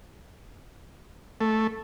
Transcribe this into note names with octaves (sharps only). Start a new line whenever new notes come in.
A3